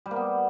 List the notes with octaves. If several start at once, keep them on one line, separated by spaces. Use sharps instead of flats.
G3
A#3
B3